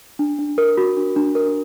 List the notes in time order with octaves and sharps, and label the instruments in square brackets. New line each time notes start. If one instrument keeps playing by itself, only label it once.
[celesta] D4
D4
A#4
F#4
D4
D4
A#4